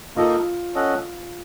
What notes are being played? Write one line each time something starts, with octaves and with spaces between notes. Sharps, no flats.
A#3 D#4 F4 A4 D#5
C#4 A4 D#5 F#5